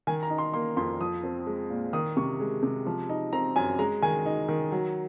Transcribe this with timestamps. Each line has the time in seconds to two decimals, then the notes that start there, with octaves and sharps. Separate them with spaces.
0.07 D#3 G#5
0.23 A#5
0.30 D#4
0.38 C6
0.53 A#3 C6
0.77 F2 C6
1.00 F3 D#6
1.23 C4
1.47 G#3
1.70 A#2
1.93 D#3 D#6
2.17 C3 C#6
2.40 G#3
2.63 C3
2.87 F3
3.09 D#4
3.33 C4 A#5
3.56 F#2 G#5
3.79 G#3 A#5
4.02 D#3 G#5
4.26 D#4
4.49 D#3
4.72 F#3